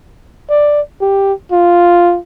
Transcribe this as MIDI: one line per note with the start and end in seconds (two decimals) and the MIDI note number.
0.50 0.81 74
1.01 1.33 67
1.51 2.18 65